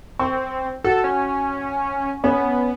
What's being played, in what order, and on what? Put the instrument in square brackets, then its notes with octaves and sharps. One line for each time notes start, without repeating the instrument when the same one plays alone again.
[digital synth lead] C4 [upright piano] C#6
[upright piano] F#4 [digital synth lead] A4
[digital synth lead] C#4
[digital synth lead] B3 [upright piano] C#4